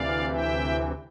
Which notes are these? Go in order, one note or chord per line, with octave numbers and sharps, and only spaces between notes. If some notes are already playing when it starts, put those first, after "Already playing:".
Already playing: D2 C3 E3 D5 F5
E5 G5